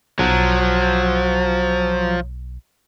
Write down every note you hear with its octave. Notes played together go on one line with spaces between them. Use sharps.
B1 F3 F#3